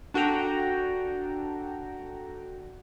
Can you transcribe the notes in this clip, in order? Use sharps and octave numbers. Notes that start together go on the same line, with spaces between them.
D4 F#4 A4 G5 A#5